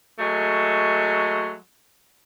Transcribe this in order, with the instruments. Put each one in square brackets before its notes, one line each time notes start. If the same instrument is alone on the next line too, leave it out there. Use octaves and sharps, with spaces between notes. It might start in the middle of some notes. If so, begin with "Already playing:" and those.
[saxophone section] F#3 G#3 A3